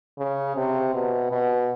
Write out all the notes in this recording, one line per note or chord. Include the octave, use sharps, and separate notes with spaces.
C#3
C3
B2
B2